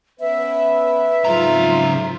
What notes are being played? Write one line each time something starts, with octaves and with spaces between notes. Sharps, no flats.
B3 C#4 B4 E5
F2 G#2 C#3 F#3 F4 A#5